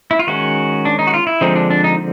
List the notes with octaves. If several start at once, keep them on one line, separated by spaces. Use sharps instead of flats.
E4
F4
D#3 G#3 C#4 F#4
D4
D#4
F#4
F4
E4
D3 F3 G#3 C4 D#4
D4
D4
D#4